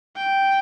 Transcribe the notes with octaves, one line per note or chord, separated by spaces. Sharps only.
G5